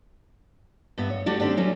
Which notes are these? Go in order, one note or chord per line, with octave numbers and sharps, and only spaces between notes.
G2 B3 E5
C#5
G3 A3 D4 F#4 G4
D#3 C4 D4 G4
F#3 G3 C#4 E4